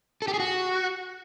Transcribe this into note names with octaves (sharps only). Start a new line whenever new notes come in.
A4
G4
G#4
F#4